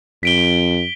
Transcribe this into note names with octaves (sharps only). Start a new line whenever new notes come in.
F2 B6 D7 G7